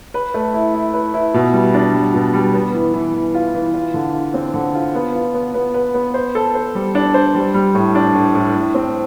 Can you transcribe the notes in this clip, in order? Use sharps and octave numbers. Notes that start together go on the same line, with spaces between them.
B4
A3
E4
E4
B4
E4
B2
G3
D4
G3
B2
G3
B3
E3
E3
E3
F4
E3
F4
D3
F4
C4
D3
F4
B3
F4
B3
B3
B4
B3
C5
A4
C5
G3
D4
C5
G3
G3
A2
D4
A2
A2
A2
C4